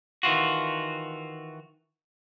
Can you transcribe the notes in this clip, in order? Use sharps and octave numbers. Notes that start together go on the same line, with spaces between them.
D#3 E3 F4 F#4